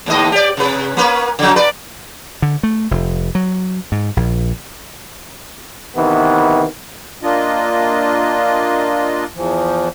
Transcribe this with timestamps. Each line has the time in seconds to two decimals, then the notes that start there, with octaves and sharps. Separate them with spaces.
0.06 D#2 A2 D#5
0.32 G4 D5
0.57 C3 B4
0.97 A#3 C#4 B4
1.39 C#3 F#3
1.56 B4 D5
2.42 D3
2.63 A3
2.91 F1
3.35 F#3
3.92 G#2
4.17 A#1
5.97 C3 D#3 E3 B3
7.23 A#3 D4 F4 D#5
9.36 E2 E3 F3